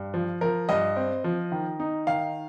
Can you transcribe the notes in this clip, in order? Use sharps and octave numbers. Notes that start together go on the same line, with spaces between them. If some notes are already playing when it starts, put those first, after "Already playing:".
Already playing: G2
F3
F3 A#4
G2 D#5
C4
F3
D#3
D#4
D#3 F5